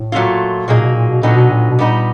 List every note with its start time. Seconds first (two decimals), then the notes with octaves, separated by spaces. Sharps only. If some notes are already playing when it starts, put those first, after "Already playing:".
Already playing: A2
0.12 A#2 F#3 A3 C4 F4
0.68 A#2 F#3 A#3 D#4 G#4
0.81 B2
0.95 A#2
1.09 B2
1.22 A#2 D3 F#3 B3 D#4
1.35 B2
1.50 A#2
1.70 B2
1.79 A#2 G3 B3 D#4